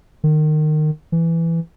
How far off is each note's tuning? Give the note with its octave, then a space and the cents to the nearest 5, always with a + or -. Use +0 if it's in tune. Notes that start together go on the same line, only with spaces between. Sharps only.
D#3 -25
E3 +10